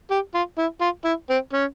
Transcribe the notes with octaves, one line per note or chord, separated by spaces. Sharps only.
G4
F4
E4
F4
E4
C4
C#4